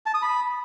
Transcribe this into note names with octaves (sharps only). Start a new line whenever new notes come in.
A5
D#6
B5